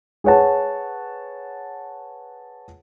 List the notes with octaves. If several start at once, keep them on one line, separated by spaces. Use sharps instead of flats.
G#4 B4 C#5 F#5 A5